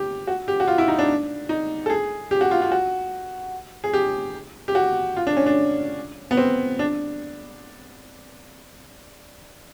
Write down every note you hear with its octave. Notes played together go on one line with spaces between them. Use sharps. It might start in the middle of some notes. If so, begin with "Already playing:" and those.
Already playing: G4
F#4
G4
F#4
F4
E4
D#4
D4
D#4
A4
G#4
G4
F#4
F4
F4
F#4
G#4
G4
G4
F#4
F4
D4
C#4
D4
B3
C4
D4